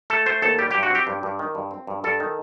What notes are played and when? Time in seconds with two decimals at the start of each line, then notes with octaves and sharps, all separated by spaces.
0.10 A3 A4
0.26 A3 C5
0.42 D#2 A4
0.58 G3 G4
0.71 G2 G4
0.83 F#4
0.90 C4 G4
1.07 G2
1.23 G2
1.39 D#3
1.55 G2
1.71 C4
1.87 G2
2.04 G2 A4
2.20 D#3